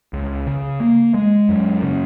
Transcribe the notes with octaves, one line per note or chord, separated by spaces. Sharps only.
C#2
C#3
A#3
G#3
F#2
C#3